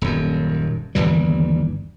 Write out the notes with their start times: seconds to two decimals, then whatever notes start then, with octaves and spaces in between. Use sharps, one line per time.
0.01 D#1 F#2
0.95 G1 D#2 E3 G3